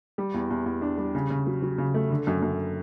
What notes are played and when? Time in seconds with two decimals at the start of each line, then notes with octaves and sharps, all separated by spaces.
0.18 G3
0.34 E2
0.50 E2
0.66 E2
0.81 D4
0.98 G3
1.15 C#3
1.30 C#3
1.47 F#3
1.62 F#3
1.78 C#3
1.94 A3
2.10 D3
2.27 F#2
2.42 F#2